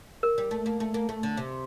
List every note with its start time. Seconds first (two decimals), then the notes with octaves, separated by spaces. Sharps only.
0.23 A#4
0.38 G3
0.51 A3
0.66 A#3
0.80 A3
0.94 A#3
1.09 A3
1.23 D3
1.37 C3